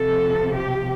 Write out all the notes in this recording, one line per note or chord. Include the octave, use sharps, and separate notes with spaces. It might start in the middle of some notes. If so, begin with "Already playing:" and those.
Already playing: C3 F3 A4
G4